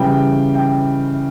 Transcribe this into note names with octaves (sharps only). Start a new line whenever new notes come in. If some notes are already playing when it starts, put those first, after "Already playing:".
Already playing: C#3 E3 G3 G5
G5